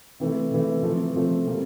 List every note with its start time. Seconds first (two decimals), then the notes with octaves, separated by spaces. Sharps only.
0.20 C3 E3 A3
0.51 C3 E3 A3
0.83 C3 F3 A3
1.15 C3 F3 A3
1.46 C3 G3 A#3